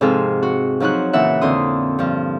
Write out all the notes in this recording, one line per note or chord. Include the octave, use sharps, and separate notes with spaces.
G#2 C3 F3 G#4 A4 F5
F#4
F3 F#3 D#4 F#4 F#6
A#2 C#3 E3 E5 F#5
F2 D3 E4 C6 D#6
G2 F3